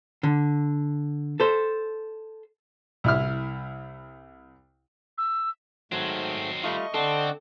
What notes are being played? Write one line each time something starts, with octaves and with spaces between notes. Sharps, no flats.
D3
A4 C5
C2 E4 F6
E6
G#2 D#3 F#3 A3 C4
G3 A3 F4 D#5 C#6
D3 C4 A4 D5 F#5